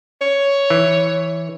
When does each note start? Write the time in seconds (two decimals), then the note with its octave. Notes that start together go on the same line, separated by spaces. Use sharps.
0.21 C#5
0.70 E3